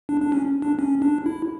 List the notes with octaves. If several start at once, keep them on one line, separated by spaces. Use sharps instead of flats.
D4
D4
C#4
D4
C#4
D4
E4